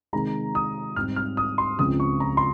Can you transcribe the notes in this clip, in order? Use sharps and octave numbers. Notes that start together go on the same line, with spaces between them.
C3 D#3 G#3 C4 A#5
D#6
G#2 G3 C4 F6
F6
D#6
C6
C#2 C#3 F3 C4 D#6
C#6
A#5
C6